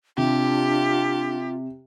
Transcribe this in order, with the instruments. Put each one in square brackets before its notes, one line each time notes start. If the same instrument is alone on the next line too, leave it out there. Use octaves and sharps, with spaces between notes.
[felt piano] C3 [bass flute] D4 [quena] F4 [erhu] G4